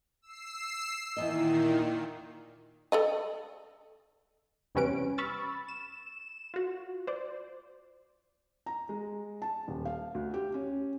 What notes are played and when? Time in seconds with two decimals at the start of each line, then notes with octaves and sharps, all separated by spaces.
0.22 E6 C7
1.17 E2 G2 A#2 D#3 D#5
2.92 A4 D5 D#5
4.75 E2 C3 G3 C#4 B4 D7
5.18 B5 C#6 E6 F6 A6
5.68 E7
6.54 F4 F#4
7.07 C5 D5
8.66 A#5
8.89 G#3
9.42 A5
9.68 D#1
9.85 F5
10.15 D2
10.34 G4
10.54 C#4